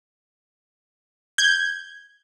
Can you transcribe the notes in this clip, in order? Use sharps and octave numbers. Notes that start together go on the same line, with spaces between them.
G6 G#6